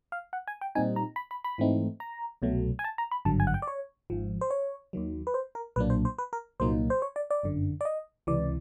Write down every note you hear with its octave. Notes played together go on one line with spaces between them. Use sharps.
F5
F#5
G#5
G5
A#2 G3 C4 D#4 G#5
A#5
B5
B5
B5
G#2 E3 A3 C4 D#4
A#5
C2 B2 F#3 A3
G#5
A5
A#5
B5
G#1 G2 D3 F#3 A5
G#5
F#5
G5
D5
C#5
G#1 G#2 F3
C5
C#5
D#2 D#3 F#3
B4
C5
A#4
B1 A#2 F#3 A#3 D4 B4
C5
C5
B4
A#4
C2 A#2 F#3 A#3 D#4 C5
C5
C#5
D5
D5
G1 F#2 D3
D5
D#5
C#2 C3 E3 D5